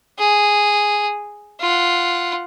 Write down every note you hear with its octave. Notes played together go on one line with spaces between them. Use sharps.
G#4
F4 F#5